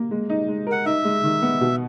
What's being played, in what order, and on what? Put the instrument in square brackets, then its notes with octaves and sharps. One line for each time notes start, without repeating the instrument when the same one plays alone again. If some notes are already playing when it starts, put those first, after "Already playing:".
Already playing: [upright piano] A#3
G#3
D#4
G#3
A#4
[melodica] F#5
[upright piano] D#4 [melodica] E5
[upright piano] G#3
D#3
B3
B2